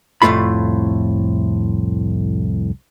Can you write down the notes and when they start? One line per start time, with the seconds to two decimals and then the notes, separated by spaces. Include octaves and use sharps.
0.22 C2 F2 A2 A3 F4 B5